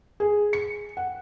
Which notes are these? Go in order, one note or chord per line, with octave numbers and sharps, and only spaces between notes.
G#4
C#7
F#5